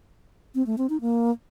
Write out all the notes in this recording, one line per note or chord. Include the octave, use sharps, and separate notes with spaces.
C4
A3
C4
D#4
A#3